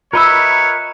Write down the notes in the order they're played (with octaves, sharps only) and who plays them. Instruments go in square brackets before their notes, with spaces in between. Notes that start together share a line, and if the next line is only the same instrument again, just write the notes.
[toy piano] F4 B5 E6 [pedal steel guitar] A#4 D#5 E5 [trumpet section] B4 C#5